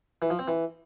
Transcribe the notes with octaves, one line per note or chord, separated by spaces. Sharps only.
E3
F3
C4
E3